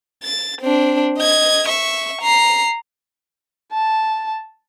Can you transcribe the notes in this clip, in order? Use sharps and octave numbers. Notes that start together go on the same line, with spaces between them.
A6
C4 D4
D#5 G#6
E5 C#6
A#5 C7
A5